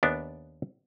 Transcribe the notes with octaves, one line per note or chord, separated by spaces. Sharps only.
D#2 B3 D4